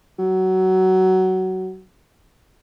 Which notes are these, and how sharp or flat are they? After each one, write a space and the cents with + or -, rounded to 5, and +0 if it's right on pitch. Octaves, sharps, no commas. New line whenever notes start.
F#3 +15